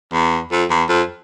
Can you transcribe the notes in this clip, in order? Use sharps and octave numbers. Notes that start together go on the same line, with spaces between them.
E2
F2
E2
F2